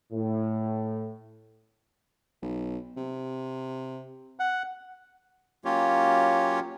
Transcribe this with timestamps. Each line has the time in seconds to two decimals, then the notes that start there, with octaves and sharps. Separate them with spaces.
0.12 A2
2.42 B1
2.97 C3
4.40 F#5
5.65 F#3 A#3 C#4 F4 G4 C#5